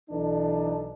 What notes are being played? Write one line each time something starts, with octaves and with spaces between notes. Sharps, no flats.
B1 E3 D4 D#4 A4